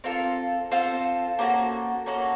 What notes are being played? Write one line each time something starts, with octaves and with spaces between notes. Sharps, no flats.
C4 F4 A4 A#4
C4 F4 A4 C5
A#3 C#4 F#4 A4 C5
A#3 C#4 F#4 A4 C#5